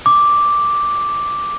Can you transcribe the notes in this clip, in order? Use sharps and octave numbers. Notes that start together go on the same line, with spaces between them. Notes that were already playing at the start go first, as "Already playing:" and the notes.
D6